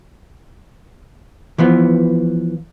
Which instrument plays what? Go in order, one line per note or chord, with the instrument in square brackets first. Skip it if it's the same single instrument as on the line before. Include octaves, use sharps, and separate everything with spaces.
[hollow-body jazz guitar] E3 F3 B3